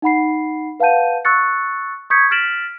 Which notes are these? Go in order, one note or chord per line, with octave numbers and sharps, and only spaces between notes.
D#4 F#5 B5 C7
B4 F5 F#5 A5 G6 D#7
C#6 E6 F#6 A6 C#7
C#6 D#6 G6 G#6 B6 C#7
F6 A6 B6 D7 E7 F#7